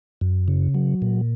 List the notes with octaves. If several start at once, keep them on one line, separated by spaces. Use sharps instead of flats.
F#2
C#3
F#3
A#2